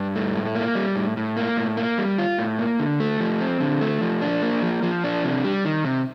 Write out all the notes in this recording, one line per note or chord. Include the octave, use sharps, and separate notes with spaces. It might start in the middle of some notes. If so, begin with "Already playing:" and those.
Already playing: G2
A3
A2
A#3
G3
A2
A2
A#3
A2
A#3
G3
F4
A2
A#3
D3
A3
F3
C4
D3
A3
F3
D4
A#3
F3
F3
D4
C3
G3
D#3
C3